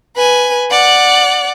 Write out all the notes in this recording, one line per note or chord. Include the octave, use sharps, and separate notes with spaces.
B4 G#5
D5 F#5